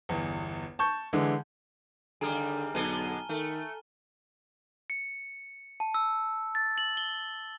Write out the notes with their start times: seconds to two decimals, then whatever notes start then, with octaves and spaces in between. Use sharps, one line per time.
0.09 G1 E2
0.79 A5 C#6 G6
1.13 D3 E3 G#3
2.21 D#2 D3 G3 G#4 G#5 A#5 F6
2.74 B1 D3 G#3 B3 A5 D#7 G7
3.29 D#3 A3
4.90 C#7
5.80 A5
5.94 E6
6.55 A6
6.78 F#7
6.97 G7